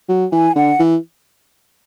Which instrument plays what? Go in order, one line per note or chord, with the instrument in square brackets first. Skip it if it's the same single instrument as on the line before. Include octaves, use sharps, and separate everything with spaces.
[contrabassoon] F#3
[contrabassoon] E3 [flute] G#5
[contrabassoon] D3 [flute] F#5
[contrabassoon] E3